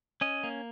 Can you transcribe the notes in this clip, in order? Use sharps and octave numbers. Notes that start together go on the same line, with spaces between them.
C#4 D#5
A#3